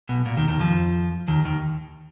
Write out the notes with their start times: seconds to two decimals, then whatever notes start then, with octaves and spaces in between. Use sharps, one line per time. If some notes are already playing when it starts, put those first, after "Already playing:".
0.09 B1 B2
0.26 A#2
0.37 D#2 D#3
0.48 D#2 D#3
0.60 F2 F3
1.28 D#2 D#3
1.45 D#2 D#3